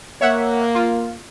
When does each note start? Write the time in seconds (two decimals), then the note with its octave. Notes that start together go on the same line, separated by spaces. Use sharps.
0.21 A#3 C#5 E5 F#5
0.75 F4